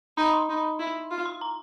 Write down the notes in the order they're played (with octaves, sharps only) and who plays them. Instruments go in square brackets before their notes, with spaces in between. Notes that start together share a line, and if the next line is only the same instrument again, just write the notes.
[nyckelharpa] D#4 [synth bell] B5
[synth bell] C6
[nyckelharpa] D#4
E4
F4
[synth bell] C6
A#5